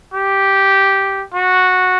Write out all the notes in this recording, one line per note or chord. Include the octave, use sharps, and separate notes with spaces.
G4
F#4